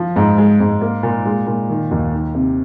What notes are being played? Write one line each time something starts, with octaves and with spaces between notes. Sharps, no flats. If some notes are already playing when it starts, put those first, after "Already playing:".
Already playing: F3
G#2
G#3
G#2
A#3
A#2
G#3
A#2
D#3
D#2
D#3
C3